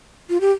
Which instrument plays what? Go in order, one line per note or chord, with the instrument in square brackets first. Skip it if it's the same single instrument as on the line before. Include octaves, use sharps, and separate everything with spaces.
[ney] F4
G4